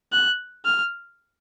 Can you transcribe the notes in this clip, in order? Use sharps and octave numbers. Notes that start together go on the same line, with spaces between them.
F#6
F6